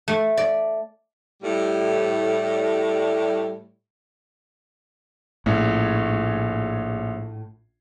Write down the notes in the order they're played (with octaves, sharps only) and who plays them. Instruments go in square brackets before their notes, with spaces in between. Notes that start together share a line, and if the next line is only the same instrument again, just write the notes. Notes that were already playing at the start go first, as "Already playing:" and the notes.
[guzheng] A3
D5
[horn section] A2 G3
[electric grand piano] A#1 C#4 C#5 [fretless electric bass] A2